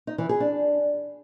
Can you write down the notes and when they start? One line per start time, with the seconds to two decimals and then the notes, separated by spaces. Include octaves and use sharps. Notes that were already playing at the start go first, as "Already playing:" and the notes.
0.07 D#4
0.18 E3
0.29 G#4
0.40 D4